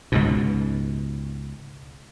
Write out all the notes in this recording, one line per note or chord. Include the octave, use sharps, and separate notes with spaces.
C#2 G#2 B2